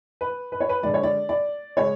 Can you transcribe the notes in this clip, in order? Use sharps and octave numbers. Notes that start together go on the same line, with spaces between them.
B4
B4
C#5
B4
D3 G#3 D5
C#5
D5
D5
C#3 G#3 C#5